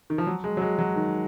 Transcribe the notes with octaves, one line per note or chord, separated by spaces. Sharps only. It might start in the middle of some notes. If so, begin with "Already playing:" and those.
D#3
F3
F#3
G#3
F#3
G#3
F#3
D#3